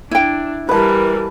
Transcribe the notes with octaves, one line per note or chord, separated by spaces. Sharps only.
D4 E4 G5
E3 G3 A#4 B4 A5